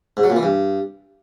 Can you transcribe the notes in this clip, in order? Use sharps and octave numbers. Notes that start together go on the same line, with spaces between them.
G#2
F#3
A#2
E3
G2